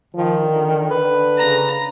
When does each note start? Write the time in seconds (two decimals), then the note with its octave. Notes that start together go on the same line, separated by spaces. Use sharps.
0.15 D#3 F3
0.44 D3
0.91 D3 B4
1.38 C#3 A#5